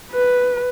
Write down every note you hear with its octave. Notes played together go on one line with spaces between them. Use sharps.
B4